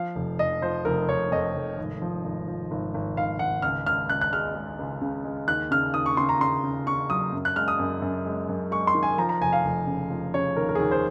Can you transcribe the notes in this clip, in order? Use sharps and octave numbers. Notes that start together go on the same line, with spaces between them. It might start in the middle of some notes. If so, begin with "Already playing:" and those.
Already playing: F3 F5
F1
F1 D#5
F3 C5
F1 A#4
F1 C#5
F2 D#5
F1
G#1
F3
G#1
F3
G#1
G#1
G#1 F5
G#1 F#5
C#2 F6
C#2 F6
C#2 F#6
F#6
G#3 F6
G#3
C#2
C#3
G#3
D#2 F#6
C#3 F6
D#2 D#6
C#6
C#3 C6
A#5
C#3 C6
C#3
C#3 C#6
F#3 D#6
F#2
F#6
G#3 F6
D#6
F#2
F#2
G#3
F#2
G#3 C#6
C6
D#3
G#5
F3 A#5
A#5
F1 G#5
F5
F1
C#3
F3
C#3 C#5
D#2 A#4
A#4
G#4
D#2 A#4
C5